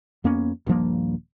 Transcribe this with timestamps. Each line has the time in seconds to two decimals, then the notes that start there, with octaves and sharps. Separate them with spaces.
0.24 F2 A#3 B3 C#4
0.67 D#1 G2 F3 A#3